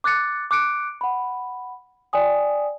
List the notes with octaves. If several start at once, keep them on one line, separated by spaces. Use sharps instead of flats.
D6 F#6 A6 C#7
D6 F#6 C#7 D7
F#5 B5
D5 G5 G#5 D#6